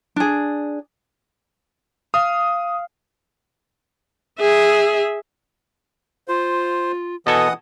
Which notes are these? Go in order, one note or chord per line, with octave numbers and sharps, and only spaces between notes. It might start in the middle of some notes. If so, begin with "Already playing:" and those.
D4 G#4
F5 D#6
G#4 E5
F4 C5
B2 E3 A4 D#5 F#5 G#5 D#6